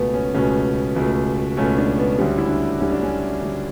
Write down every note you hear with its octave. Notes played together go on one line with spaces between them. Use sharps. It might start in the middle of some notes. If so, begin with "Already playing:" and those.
Already playing: C#2 B2 A3 B3
C#4
C#2 B2 A3 C#4
C#2 B2 A3
C#2 B2 A3 C#4
D4
B3
D2 D3 G3 C#4
E4
D4
D2 D3 G3 C#4
D4
C#4
D2 D3 G3